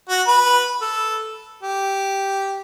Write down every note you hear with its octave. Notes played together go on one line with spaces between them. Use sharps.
F#4
B4
A4
G4